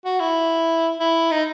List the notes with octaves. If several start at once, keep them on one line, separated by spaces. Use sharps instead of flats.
F#4
E4
E4
D#4